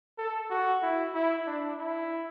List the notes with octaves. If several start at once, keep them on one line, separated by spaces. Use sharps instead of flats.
A4
F#4
E4
E4
D4
E4